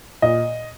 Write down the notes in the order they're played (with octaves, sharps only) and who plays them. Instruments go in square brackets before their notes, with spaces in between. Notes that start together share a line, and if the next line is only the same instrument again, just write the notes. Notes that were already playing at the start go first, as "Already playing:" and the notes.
[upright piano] A#2 D#5